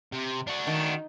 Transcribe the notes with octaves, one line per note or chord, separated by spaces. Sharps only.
C3
D4 F#4
D#3